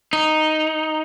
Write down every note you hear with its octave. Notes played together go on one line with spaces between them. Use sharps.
D#4